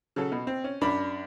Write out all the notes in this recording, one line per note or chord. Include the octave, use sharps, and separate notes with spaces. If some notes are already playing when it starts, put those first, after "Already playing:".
C#3 F#3 A4
B2
C4
C#4
F#2 D4 B5